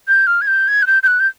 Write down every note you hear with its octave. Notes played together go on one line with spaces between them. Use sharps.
G6
F6
G#6
G6
G#6
F#6
G6
G6
F#6
G6